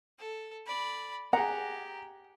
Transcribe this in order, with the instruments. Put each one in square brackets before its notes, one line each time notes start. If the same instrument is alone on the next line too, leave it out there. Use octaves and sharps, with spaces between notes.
[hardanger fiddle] A4
D5 B5
[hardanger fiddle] G4 [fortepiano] G#4 A#5 [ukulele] F#5